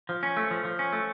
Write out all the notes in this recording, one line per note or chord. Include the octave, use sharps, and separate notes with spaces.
F3
C#4
A3
F3
F3
C#4
A3